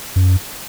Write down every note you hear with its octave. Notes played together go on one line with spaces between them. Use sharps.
F#2